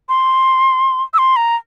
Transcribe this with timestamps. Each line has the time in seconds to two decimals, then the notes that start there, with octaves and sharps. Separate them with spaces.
0.09 C6
1.14 E6
1.18 C6
1.36 A#5